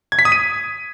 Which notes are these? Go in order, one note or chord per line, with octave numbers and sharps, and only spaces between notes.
G#6
B6
D#6
D#7